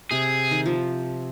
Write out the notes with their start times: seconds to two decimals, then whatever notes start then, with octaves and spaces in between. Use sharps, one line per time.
0.11 C3 G#4
0.51 D#3
0.66 F3